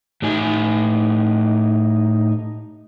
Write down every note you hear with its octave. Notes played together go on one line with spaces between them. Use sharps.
A2 D#4 G4 G#5